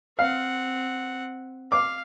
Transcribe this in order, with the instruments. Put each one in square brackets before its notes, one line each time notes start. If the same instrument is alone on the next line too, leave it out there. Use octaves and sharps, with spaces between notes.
[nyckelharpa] C4 F#5 [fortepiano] F5
[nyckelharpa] F5 [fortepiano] D6